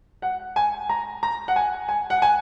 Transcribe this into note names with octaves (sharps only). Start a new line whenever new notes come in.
F#5
G#5
A#5
A#5
F#5
G#5
G#5
F#5
G#5